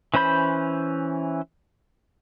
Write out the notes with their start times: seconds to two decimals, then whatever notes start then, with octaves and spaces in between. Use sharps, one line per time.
0.14 E3 C#4 C5 B5 G6